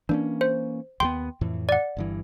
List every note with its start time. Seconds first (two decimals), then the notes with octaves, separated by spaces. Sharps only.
0.09 E3 A#3 C#4 D4
0.41 C5
1.00 D#2 G3 B3 G5 C6
1.41 F2 A2 E3
1.69 D5 F#5
1.97 G1 G2 E3